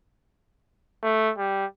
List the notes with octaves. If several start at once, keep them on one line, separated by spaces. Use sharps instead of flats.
A3
G3